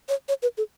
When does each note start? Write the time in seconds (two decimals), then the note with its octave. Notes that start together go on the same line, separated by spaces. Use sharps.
0.09 C#5
0.29 C#5
0.43 B4
0.58 A4